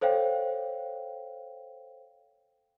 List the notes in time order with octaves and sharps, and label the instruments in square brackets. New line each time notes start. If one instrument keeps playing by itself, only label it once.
[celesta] A4 C5 C#5 F5 G5